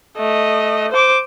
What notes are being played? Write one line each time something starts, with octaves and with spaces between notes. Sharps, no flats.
A3 D#5
C5 D6